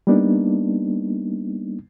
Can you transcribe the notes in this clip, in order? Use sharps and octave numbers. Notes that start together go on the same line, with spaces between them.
G3 A#3 B3 D4 D#4